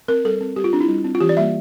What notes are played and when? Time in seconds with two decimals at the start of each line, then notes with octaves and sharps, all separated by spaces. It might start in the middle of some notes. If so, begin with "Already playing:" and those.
0.08 C4 A#4
0.25 G3 A4
0.41 C4
0.56 G3 G4
0.64 F4
0.73 C4 D4
0.81 E4
0.88 G3
1.05 C4
1.15 F4
1.20 E3 G4
1.29 D5
1.37 G3 A#3 E5